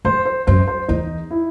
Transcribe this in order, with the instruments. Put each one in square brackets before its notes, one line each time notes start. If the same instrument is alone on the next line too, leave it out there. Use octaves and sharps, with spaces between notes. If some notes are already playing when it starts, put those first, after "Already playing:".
[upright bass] F#2 [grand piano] C5
[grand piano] C5
[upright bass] F#2 [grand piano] C5
[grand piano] C5
[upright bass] E2 [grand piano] D#4
[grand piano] E4